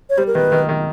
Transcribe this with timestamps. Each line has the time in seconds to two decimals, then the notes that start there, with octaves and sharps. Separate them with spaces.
0.10 C#5
0.17 G3 C5
0.27 A#4
0.35 D#3 B4
0.52 D#3
0.69 D#3